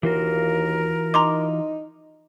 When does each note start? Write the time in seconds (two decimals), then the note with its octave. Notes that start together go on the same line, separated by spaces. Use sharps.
0.03 D#2 E3 F4 F#4 A#4
1.14 D#4 A#5 C6 D6